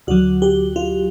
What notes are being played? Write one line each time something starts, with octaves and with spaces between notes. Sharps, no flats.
D2 D3 F#3 F#4
G4
F4